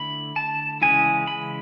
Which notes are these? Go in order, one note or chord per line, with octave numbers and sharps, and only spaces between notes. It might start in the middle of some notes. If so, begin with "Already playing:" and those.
Already playing: D3 A3 E4 B5
A5
C#3 E3 G#3 C#4 E4 G#5
B5